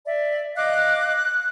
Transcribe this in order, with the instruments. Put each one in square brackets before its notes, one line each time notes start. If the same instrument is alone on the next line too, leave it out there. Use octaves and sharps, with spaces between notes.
[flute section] D5 E5
[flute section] D#5 F5 D6 [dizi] F#6